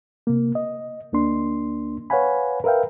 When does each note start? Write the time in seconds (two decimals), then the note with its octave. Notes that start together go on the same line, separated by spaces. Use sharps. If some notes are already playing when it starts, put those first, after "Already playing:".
0.27 C3 A#3
0.55 D#5
1.12 D2 A#3 D4 C6
2.10 B4 C#5 F5 F#5 G#5 B5
2.64 A#4 B4 E5 F5 G5